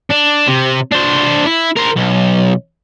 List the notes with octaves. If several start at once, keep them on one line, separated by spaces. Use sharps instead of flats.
D4
C3
D4 C5
E4
A#4 C5
B1